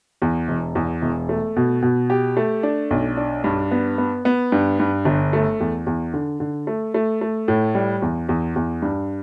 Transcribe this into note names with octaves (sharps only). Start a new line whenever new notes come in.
E2
E1
E2
E1
A3
B2
B2
G4
A3
D4
B1
D4
G2
B3
B3
B3
G2
G2
G1
A3
E2
E2
D3
D3
A3
A3
A3
A2
G3
E2
E2
E2
G2